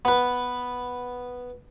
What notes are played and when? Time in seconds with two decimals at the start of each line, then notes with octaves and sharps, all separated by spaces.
0.05 B3 B4